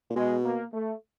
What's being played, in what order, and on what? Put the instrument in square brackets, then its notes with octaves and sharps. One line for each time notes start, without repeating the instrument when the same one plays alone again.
[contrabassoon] A#2
[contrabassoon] B2 [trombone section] G#3
[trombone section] A#3
A3